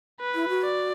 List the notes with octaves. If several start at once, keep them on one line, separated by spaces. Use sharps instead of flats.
B4
E4
F#4
D5